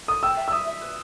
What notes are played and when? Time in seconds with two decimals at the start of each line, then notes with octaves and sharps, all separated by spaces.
0.08 A4 D#6
0.23 G5 E6
0.37 E5
0.48 E6
0.52 E5 D#6
0.67 E5
0.82 B4